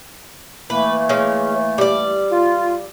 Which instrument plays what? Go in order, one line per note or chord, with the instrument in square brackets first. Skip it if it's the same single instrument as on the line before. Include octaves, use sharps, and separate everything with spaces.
[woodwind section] E3 A3 A#3 [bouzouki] B4
[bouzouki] G#3 C#4
G3 D5
[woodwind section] F4